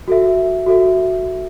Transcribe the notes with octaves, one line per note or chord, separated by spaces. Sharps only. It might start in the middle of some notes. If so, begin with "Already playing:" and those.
F#4 A4 E5
F#4 A4 E5